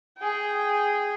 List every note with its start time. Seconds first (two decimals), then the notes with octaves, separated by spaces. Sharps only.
0.19 G#4 G5